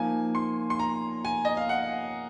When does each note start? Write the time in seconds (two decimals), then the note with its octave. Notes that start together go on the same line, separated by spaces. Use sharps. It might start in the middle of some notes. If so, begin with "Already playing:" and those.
Already playing: F3 A#3 D#4 G#5
0.35 C6
0.70 C6
0.79 A#5
1.25 G#5
1.45 D#5
1.57 F5
1.69 F#5